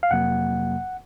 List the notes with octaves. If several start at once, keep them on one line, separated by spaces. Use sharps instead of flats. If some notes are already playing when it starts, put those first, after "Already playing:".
F5
F2 C3 F#3 A#3 F#5